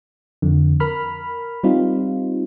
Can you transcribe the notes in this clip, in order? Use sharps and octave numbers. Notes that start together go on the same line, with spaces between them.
F2 D3
A#4 B5 F6
G3 C4 D#4 F4